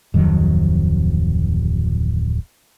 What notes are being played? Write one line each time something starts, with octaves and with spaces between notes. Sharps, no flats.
D1 F2 D#3 F#3